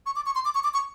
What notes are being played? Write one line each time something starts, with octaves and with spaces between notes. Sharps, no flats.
C#6
D6
C#6
C6
D6
C#6
D6
C#6